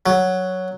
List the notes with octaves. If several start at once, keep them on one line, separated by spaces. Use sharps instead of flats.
F#3